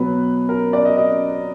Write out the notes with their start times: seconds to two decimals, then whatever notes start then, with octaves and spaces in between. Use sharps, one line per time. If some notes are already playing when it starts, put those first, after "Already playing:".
Already playing: B2 F#3 B3 B4
0.49 A#4
0.73 D5
0.85 D#5
0.97 D#5